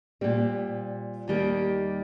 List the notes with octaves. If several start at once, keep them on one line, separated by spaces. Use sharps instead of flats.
A#2 G3 C4
D#2 D#3 G3 A#3